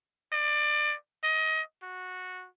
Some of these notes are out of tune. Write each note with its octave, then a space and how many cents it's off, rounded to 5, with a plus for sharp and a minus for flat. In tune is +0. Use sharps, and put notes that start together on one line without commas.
D5 +25
D#5 +25
F#4 -10